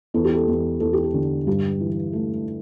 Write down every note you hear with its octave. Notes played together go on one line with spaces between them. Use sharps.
E2 A4
G4
A4
E2
E2 A4
G4
A4
D3
G2 G4
E3
A3